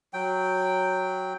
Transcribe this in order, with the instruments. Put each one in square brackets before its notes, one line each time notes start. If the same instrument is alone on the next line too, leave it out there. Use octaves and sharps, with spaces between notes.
[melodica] F#3 G5